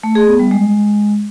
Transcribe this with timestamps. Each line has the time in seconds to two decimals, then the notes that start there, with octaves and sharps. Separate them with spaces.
0.03 A3
0.15 G#4
0.27 B3
0.39 G3
0.51 G#3